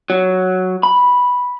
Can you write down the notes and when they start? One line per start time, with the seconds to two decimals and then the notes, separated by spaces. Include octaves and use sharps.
0.10 F#3
0.83 B5